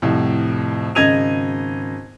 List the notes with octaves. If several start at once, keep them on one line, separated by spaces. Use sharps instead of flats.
C2 F2 A2
G#1 C#3 D#5 G#6 D#7 F7